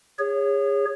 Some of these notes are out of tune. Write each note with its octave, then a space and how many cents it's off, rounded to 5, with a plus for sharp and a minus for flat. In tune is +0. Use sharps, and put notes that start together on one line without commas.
G#4 -30 C#5 +0